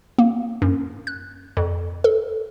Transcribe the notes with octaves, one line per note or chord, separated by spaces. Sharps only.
A#3
F#2
F#6
F2
A4